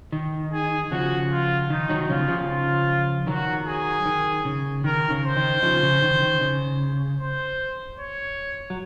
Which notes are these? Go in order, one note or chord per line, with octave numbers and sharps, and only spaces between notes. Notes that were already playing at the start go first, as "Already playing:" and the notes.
D#3
G#4
C#3 F3 F#4
F4
D#3 D#4
D#3 F#3
C#3 F3 F4
C#3 F3
F4
D#3 F#3 F#4
G#4
D#3
C#3
D#3 A#4
C#3
C5
D#3
C#3 F3
C#3
D#3
D#3
C#3
C5
C#5
F#3